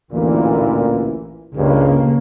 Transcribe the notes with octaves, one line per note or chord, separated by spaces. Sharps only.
A1 D2 A#2 E3
C#2 G2 C#3 A#3